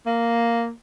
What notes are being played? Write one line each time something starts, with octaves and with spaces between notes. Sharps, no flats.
A#3